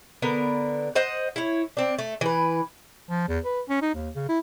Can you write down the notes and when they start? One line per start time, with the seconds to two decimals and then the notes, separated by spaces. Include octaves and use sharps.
0.22 D3 B3 A#4
0.95 C5 D#5 F#5
1.36 E4 C#5
1.77 C4 D4
1.99 A3
2.21 E3 B4
3.09 F3
3.28 E2
3.44 B4
3.69 C#4
3.82 D#4
3.94 D#2
4.15 C#3
4.29 E4